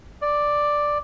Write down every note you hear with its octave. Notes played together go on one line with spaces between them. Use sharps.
D5